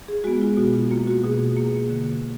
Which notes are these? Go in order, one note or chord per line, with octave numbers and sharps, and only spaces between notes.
G#4
G#3 B3 F#4
F4
B2 F#4
F4
A#3 F4
F#4
B2 G#4
A#3
D3